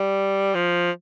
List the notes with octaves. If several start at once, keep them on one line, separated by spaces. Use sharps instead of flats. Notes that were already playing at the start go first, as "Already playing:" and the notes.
Already playing: G3
F3